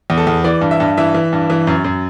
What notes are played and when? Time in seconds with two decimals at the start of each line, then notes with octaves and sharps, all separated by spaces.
0.10 E2
0.17 A4
0.27 E2
0.44 E3 D5
0.61 G2
0.71 E5
0.80 G2
0.98 E3 E5
1.14 E3
1.33 G2
1.50 E3
1.67 F#2
1.84 F#2